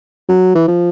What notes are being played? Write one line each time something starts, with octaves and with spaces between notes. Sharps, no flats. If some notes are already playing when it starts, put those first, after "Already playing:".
F#3
E3
F3